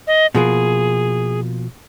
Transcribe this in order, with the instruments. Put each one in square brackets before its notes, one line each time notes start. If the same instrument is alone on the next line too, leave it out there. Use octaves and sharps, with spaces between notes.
[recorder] D#5
[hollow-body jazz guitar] B2 F3 A#3 [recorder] G#4